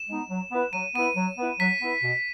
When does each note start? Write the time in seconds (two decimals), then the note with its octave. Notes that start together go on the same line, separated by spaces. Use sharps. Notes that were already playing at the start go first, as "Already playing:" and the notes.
Already playing: E7
0.09 G#3 B3 D#4
0.30 F#3
0.52 B3 E4 B4
0.73 F#3 D#7
0.95 B3 E4 B4 D#7
1.17 F#3
1.38 B3 E4 B4
1.60 F#3 B6
1.81 B3 E4 B4
2.03 B2